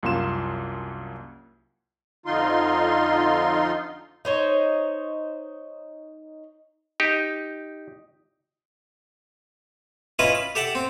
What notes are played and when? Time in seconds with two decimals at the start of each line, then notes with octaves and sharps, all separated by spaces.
0.03 C2 F#2 A#3 F4 C6 E7
2.26 F2 D3 D#4 F4 C6
4.25 D#4 C5 C#5
7.00 D#4 G4
10.19 C#4 E4 F4 B4 D#5 E5
10.35 B5
10.55 G4 A4 E5 F#5
10.75 C4